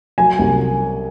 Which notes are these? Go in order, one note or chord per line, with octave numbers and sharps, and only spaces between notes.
F#3 G#5
C2